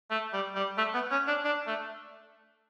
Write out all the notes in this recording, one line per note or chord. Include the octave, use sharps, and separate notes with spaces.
A3
G3
G3
A3
B3
C#4
D4
D4
A3